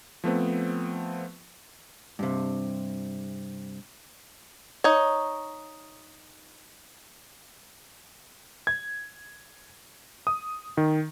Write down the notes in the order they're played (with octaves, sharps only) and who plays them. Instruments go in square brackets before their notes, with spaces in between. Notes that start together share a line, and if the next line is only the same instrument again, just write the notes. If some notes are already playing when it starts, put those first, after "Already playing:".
[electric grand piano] F3 A3 B3 C4
[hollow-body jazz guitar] G2 C3
[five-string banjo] D#4 C#5
[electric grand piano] G#6
D#6
D#3